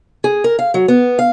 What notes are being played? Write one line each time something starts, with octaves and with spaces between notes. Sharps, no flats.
G#4
A#4
F5
F#3
B3
F5